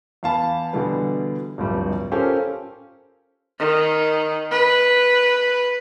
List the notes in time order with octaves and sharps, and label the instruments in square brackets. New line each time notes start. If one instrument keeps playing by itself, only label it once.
[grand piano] E2 F5 A5 B5
B2 D3 E3 G3 B3
D1 A#1 G2 G3
C#4 F4 G4 A4 A#4 C5
[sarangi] D#3
B4